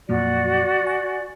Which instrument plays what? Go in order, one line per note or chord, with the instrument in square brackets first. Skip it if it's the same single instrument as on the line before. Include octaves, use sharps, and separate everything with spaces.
[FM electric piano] F2 A#2 F#3 [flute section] F#4 D5
[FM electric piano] G#5